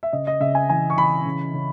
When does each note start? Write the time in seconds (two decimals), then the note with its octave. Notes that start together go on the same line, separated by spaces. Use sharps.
0.03 E5
0.13 C#3 D#5
0.27 D#5
0.40 C#3 E5
0.55 G#5
0.69 E3 G#5
0.90 C#6
0.97 E3 B5
1.25 C#3
1.54 C#3